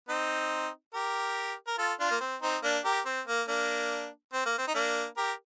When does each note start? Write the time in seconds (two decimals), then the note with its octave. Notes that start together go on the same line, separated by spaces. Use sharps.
0.09 C4 D#4
0.94 G4 A#4
1.67 A#4
1.78 F4 A4
2.00 D4 F4
2.11 A#3
2.21 C4
2.42 C4 D#4
2.63 A#3 D4
2.85 G4 A#4
3.06 C4
3.27 A#3
3.48 A#3 D4
4.33 C4
4.46 A#3
4.58 C4
4.68 D#4
4.75 A#3 D4
5.17 G4 A#4